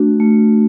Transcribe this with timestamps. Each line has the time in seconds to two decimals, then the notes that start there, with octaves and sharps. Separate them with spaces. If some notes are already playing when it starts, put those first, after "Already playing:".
Already playing: A3 D4 F#4
0.20 A3